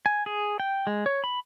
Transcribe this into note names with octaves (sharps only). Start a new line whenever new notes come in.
G#5
G#4
G5
G#3
C#5
B5